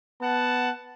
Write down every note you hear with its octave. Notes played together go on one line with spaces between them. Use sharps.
B3 F#5 A5